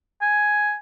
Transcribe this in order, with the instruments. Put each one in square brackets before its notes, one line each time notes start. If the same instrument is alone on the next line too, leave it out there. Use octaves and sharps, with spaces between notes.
[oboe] G#5